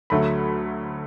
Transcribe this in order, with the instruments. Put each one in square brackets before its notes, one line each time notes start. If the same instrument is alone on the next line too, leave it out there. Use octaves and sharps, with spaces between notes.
[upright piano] D2 D3 F#3 A3 B5